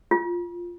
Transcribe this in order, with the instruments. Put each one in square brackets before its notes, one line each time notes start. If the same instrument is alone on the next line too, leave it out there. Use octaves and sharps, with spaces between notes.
[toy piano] F4